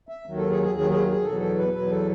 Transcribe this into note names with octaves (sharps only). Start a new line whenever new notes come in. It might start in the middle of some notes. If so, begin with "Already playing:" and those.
E5
D#2 D#3 F#3
A4
G#4
G#4
D#2 D#3 F#3 G#4
G#4
G#4
E2 B2 F#3 A4
A4
B4
E2 B2 F#3 B4
A4